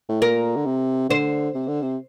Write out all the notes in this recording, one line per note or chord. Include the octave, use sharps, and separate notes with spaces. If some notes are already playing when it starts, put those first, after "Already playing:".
A2
A#2 A#4
D3
C3
D3 C5
C3
D3
C3